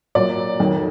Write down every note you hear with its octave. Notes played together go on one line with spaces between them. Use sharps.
A#2 F#3 D5
F2 D#3 F#3